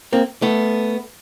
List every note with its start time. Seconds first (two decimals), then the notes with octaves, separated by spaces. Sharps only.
0.13 A#3 C4
0.42 A3 B3